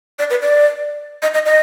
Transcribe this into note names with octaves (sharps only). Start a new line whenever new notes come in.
D5
B4
D5
D#5
D#5
D#5